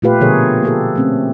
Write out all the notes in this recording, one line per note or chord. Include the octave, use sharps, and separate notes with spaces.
A#2 A3 F4 G4 B4 F5
B2 D3 F3 G#4 A#4 C#5
A#3 G4 A4
A3 C4 C#4